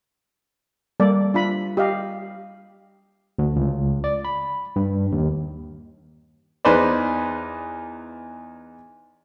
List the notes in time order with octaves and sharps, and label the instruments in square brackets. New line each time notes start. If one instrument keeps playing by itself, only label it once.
[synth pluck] G3 [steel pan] A#3 A4 D5
[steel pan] D4 F4 B5
G4 D#5 F5
[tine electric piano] D2
C#2
D5
B5
G2
D#2
[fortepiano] E2 D#4 B4 C5 D5